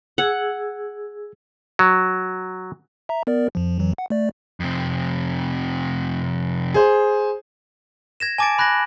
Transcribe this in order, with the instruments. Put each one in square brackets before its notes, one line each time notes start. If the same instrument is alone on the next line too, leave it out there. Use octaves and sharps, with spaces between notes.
[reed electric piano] G#4 E6 G#6 [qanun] F#5
[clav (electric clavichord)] F#3
[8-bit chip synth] E5 A#5
B3 A#4 D5
F2 F3
F2 E3 F#3
F#5
A3 D5
[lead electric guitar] F2 C3
[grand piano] G#4 C5
[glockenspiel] G#6 A#6 E7
G#5 A5 D6 G#6 A6 D7
B5 F#6 G#6 A#6 F#7